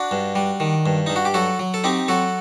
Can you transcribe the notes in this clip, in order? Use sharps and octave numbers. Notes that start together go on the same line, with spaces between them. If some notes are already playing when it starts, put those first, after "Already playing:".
Already playing: D4 F#4
G2
G3
D#3
G2
G2 D#4
F#4
G4
F#3 F#4 A4
F#3
A4
C4 D#4 G4
F#3 F#4 A4